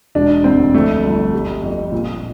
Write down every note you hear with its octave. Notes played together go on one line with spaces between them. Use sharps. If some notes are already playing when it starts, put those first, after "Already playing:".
E1 D4
D2 C4
F2 A3
G1
G3
F2
A#2